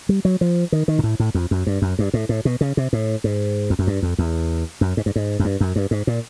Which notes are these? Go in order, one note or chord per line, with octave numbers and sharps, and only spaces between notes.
G3
F#3
F3
D#3
D#3
A#2
A2
A2
F2
F#2
G2
F#2
G2
A2
A2
B2
C#3
C3
A2
G#2
F2
F#2
G2
F2
E2
F#2
G#2
G2
G#2
F#2
G2
F#2
G2
G#2
A#2